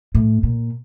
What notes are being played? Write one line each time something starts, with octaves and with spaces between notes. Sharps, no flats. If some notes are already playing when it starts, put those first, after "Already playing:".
A2
A#2